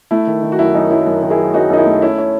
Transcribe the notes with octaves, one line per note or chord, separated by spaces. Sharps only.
A3 E4
D#3
D#3
F#4
F#2 E4
F#2 D#4
F#3 E4
F#2
D#3
E4 G#4
F#3
F#2 D#4 F#4
F#2 D#4
E4
A3
C#4 E4
C#4